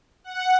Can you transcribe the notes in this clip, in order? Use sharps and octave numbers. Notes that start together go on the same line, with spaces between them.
F#5